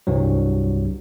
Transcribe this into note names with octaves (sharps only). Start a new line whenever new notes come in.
C2 G2 F#3